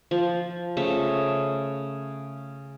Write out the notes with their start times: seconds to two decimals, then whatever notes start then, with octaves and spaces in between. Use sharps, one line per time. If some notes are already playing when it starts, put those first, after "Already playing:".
0.11 F3
0.77 C#3 A3 E5